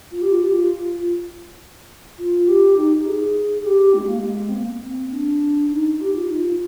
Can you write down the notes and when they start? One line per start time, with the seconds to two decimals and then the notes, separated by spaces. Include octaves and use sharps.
0.11 F4
0.21 G4
0.32 F4
0.43 G4
0.53 F4
2.18 F4
2.48 G4
2.76 D#4
3.06 G#4
3.58 G#4
3.66 G4
3.94 G#3
4.06 A#3
4.18 G#3
4.49 C4
4.54 A#3
4.84 C4
5.12 D4
5.71 D#4
6.01 G4
6.13 F4
6.27 D#4
6.39 F4